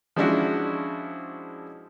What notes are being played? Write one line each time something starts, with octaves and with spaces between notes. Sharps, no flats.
F3 G#3 C#4 D4 E4 F#4